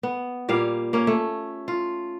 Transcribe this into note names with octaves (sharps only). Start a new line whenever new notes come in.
B3
A#2 G3 A#3 F5
A#3 C#4
A3
F4